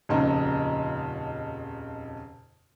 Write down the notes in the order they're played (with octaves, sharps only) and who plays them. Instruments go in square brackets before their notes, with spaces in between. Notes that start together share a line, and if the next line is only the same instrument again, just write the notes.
[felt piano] D#1 F2 C#3 D#4 A#5